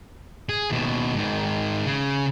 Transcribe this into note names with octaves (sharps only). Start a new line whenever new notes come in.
G#4
D#2 B2
G#2 D#3
C#3